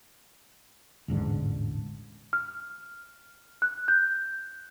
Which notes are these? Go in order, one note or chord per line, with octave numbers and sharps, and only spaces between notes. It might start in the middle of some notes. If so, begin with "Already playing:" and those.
E1 A1 G#2 D3
F6
F#6
G6